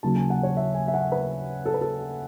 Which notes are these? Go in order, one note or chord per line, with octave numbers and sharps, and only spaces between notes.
D#2 C#3 F#3 A5
G#5
F#5
C#5
E5
G#5
E5
F#5
B4
A4
B4
A4